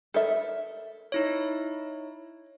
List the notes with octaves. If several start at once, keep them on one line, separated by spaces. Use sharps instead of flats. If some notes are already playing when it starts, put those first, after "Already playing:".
A4 A#4 E5
D#4 E4 C#5